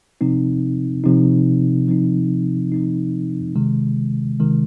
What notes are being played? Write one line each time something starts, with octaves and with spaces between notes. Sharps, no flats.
C3 F3 C4 D#4
C3 F3 C4 D#4
C3 F3 C4 D#4
C3 F3 C4 D#4
C3 D#3 G#3
C3 D#3 G#3